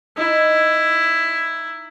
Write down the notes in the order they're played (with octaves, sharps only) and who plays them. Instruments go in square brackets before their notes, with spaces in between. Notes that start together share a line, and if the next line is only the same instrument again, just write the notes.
[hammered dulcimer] D#4 [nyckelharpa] E4